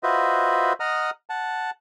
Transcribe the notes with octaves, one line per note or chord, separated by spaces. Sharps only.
F4 F#4 B4 C5 D#5 E5
D#5 F#5 A#5 D#6 F6
F#5 A5